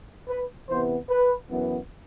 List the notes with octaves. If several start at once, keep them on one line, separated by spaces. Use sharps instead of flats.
B4
C3 E3 B3 C5
B4
F#2 E3 B3